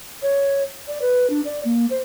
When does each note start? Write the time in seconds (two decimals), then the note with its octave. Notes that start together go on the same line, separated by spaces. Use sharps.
0.22 C#5
0.88 D5
1.02 B4
1.30 D4
1.45 D5
1.65 A#3
1.90 C5